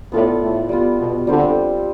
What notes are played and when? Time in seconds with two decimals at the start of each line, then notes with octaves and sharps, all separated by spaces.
0.12 A2 B3 F4 A4 D5
0.41 A2
0.69 G3 B3 F4
0.99 B2
1.27 D3 G3 C4 G4 C5